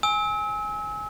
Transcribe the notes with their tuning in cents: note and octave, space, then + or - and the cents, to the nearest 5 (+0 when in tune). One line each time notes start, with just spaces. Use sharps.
G#5 +0 E6 -35